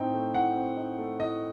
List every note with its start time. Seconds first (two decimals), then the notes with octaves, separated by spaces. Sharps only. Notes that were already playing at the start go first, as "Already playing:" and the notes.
Already playing: A2 C4 D#4 G5
0.14 A3
0.34 A2 F#5
0.56 C4
0.77 D#4
0.98 A3
1.20 A2 D#5